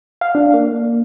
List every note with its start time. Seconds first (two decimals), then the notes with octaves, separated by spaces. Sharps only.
0.21 F5
0.35 D4
0.54 A#3